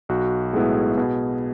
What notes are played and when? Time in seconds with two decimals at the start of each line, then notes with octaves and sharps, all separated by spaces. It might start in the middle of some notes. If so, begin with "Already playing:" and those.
0.09 B1 F#4
0.53 A2 G#3 B3 E4 G#4
0.97 B2